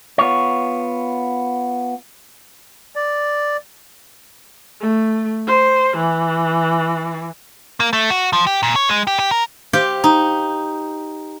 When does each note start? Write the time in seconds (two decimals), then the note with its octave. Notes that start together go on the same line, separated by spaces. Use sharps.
0.18 B3 F4 C#5
2.96 D5
4.81 A3
5.47 C5
5.97 E3
7.80 A#3
7.93 A3
8.10 F#4
8.33 F3
8.47 G4
8.63 A#2
8.76 C#5
8.89 G#3
9.07 G4
9.19 G4
9.31 A#4
9.73 G4 C5 F5 G5
10.04 D#4